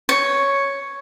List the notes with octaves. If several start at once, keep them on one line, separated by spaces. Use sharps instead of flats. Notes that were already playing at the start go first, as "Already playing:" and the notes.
C#5